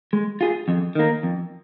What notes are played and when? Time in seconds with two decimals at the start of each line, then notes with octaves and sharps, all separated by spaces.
0.13 G#3
0.41 F4 G#4
0.68 F2
0.95 D#3 A#3
1.23 F2